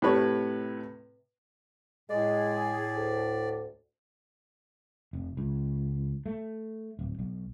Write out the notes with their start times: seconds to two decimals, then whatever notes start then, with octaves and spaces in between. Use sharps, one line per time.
0.02 A2 C3 B4 C#5
2.10 A2 G#3 G#4 D5
2.94 D2
5.13 F1
5.37 C#2
6.26 A3
6.99 D1
7.19 B1